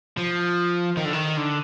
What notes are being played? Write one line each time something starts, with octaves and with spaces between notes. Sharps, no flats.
F3
D#3
D3
D#3
D3